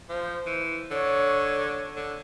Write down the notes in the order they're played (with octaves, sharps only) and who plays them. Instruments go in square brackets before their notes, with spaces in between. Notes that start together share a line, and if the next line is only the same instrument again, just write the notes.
[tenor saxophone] F3 [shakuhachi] C5
[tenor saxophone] E3
[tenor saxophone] D3 [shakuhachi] C#5
[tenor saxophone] D3